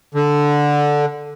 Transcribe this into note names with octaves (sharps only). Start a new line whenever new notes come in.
D3